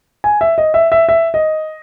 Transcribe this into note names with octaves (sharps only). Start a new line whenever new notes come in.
G#5
E5
D#5
E5
E5
E5
D#5